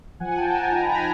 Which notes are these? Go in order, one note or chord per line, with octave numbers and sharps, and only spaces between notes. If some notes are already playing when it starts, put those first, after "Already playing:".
F3 F#5 G#5
F3 G5 A5
F3 G#5 A#5
D#4 A#5
B5
D#4 G#5 A#5